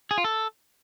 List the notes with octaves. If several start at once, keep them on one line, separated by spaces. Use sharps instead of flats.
G#4
F4
A4